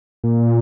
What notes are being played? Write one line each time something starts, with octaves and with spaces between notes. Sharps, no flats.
A#2